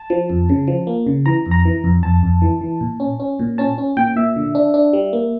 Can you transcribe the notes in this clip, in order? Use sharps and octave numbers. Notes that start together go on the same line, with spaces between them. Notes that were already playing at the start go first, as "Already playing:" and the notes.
Already playing: A5
F3
F2
C#3
F3
A#3
C#3
E3 A#5
F2
A#5
E3
F2
F2 A5
F2
E3
E3
A#2
C#4
C#4
A#2
C#4 A5
C#4
A#2 G5
A#2 E5
D3
D4
D4
G3
A#3